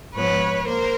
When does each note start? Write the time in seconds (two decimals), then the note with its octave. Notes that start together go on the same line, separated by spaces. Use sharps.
0.14 G#2 F3 G#3 B3 B4 C#5
0.67 A#3 A#4 C5